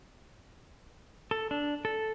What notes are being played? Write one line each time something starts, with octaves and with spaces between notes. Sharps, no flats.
A4
D4
A4